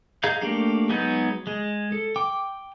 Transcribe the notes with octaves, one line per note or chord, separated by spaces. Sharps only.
G#4 D#5 F5 A#5 G6
A3 A#3 D4 G4 F5
F#3 G#3 B3 D#4 G6
G#3
A4
G5 D6